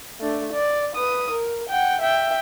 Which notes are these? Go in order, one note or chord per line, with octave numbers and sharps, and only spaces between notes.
A3 D4
D5
B4 D#6
A#4
F#5 G5
E5 G5